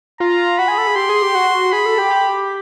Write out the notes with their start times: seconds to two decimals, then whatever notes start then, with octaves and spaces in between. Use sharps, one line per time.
0.20 F4 A#5
0.58 F#4 B5
0.68 G#4
0.78 A4
0.87 G#4
0.96 G4 C6
1.09 G#4
1.22 G4
1.35 F#4
1.72 G#4 B5
1.86 A4
1.98 G4
2.11 G4